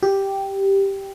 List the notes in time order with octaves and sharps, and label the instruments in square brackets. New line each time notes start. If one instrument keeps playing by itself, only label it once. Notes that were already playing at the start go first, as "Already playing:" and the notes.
[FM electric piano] G4